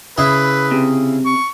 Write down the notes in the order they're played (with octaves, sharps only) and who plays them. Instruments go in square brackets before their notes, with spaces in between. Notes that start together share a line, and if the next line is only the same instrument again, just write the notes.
[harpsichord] C#3 E4 G#4 [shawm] B4
[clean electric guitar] C3
[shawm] C#6